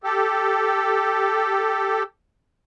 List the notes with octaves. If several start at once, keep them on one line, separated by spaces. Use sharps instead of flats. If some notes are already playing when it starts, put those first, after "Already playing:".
G4 A4